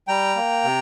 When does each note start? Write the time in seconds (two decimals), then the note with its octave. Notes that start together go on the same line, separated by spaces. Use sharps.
0.08 G3 G5 A#5
0.36 A#3
0.64 C3